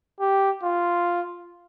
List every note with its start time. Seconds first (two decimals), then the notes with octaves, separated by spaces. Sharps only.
0.20 G4
0.63 F4